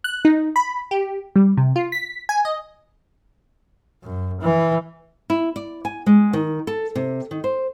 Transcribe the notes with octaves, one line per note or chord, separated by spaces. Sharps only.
F#6
D#4
B5
G4
G3
C3
F4
B6
G#5
D#5
F#2
E3
E4
D5
G#5
G#3
D#3
A4
C3
D#3
C5